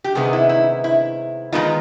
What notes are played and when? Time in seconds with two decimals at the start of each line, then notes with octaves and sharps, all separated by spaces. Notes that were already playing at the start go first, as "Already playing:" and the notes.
0.04 G4
0.15 C3 D#3 G#3 B3 D#4 G#4
0.33 E4
0.49 E4
0.84 E4
1.52 D#3 G#3 B3 D#4 F4